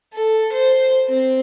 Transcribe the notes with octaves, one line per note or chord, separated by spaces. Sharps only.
A4
C5
C4